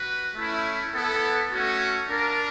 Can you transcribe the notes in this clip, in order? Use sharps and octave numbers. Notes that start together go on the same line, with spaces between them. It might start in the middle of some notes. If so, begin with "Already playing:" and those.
Already playing: F#4 B4
A3 C#4 E4
B3 E4 A4
A3 C#4 F#4
D4 F4 A#4